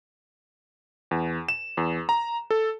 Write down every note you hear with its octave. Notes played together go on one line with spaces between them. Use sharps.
E2
E7
E2
A#5
A4